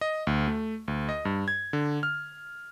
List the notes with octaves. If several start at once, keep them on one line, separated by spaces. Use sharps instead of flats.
D#5
D2
A3
D2
D#5
G2
G#6
D3
F6